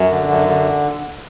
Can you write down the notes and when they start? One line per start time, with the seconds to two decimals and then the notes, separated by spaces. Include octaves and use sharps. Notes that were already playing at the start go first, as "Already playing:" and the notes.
Already playing: F#2
0.11 D3
0.29 F#2
0.48 D3